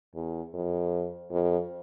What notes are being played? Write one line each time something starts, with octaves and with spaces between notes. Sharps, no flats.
E2
F2
F2